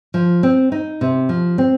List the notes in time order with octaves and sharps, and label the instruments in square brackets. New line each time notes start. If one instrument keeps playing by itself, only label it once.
[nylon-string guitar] F3
C4
D#4
C3
F3
C4